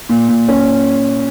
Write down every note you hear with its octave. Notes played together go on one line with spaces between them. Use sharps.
A#2
A#2
C#4